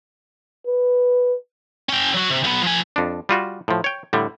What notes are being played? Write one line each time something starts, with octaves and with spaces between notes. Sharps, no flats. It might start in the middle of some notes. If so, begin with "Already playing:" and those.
B4
C#4 G5
F#3 F#4
C3
B1 B3
F3 G#5
F2 D4
G3 F4 F#4
A2 F3
C#5 G5
A2 D3 G3